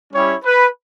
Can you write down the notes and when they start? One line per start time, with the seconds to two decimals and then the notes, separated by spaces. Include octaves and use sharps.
0.13 G3 C#4 E4 G4 C#5
0.44 B4